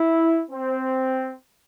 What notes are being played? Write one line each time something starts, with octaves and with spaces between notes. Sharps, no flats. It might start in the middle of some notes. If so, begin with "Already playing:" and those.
Already playing: E4
C4